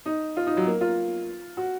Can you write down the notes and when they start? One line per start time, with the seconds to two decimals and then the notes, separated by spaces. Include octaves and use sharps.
0.06 D#4
0.37 F4
0.47 D#4
0.57 F#3
0.66 A#3
0.81 F4
1.57 F#4